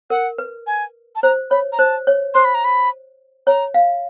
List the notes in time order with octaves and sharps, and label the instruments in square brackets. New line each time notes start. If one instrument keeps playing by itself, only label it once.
[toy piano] A#4 [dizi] F#5
[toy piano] B4
[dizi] G#5
A5
[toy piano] C5 [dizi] A#5
[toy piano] C#5 [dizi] B5
[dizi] A#5
[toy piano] C5 [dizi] A5
[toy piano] C#5
[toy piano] C5 [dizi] C6
[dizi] B5
A#5
B5
[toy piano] C#5 [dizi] A#5
[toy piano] F5